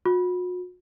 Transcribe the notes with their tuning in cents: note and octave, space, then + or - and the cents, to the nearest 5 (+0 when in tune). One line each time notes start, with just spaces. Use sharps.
F#4 -40